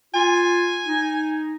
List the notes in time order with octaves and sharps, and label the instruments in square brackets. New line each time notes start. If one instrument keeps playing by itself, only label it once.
[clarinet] F4 [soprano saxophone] G#5
[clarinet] D#4